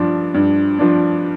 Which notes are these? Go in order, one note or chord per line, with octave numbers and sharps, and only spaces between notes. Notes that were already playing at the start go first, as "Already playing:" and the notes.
Already playing: G2 F3 D4
G2
F3 D4